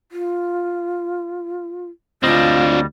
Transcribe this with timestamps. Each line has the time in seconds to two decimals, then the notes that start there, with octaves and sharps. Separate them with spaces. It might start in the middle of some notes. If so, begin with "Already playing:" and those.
0.12 F4
2.23 D2 G3 C4 D4 F4 D#5